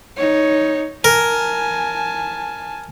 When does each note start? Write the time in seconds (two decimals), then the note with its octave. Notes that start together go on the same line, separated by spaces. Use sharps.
0.17 D#4 C#5
1.04 A#4 G#5 A5